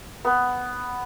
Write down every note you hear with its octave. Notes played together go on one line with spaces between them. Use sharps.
B3